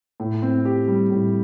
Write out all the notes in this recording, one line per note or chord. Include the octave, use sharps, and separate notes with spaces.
A2
C4
G4
G3
A2